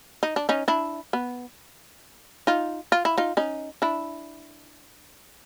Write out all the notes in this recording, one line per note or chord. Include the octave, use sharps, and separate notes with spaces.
D#4
D4
C#4 D#4
D4 E4
B3
D#4 F4
F4
E4
D#4 F4
C#4 D#4
D4 E4